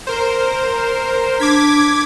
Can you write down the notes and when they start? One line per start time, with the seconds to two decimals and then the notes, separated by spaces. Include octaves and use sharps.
0.07 A#4 C5
1.40 D4 D6 G#6 B6